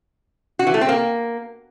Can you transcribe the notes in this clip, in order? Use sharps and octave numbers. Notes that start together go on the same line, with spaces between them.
F#4
E3
A3
C4
A#3